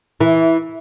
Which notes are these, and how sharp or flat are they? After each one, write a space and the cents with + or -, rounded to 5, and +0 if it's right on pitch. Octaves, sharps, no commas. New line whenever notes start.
E3 -10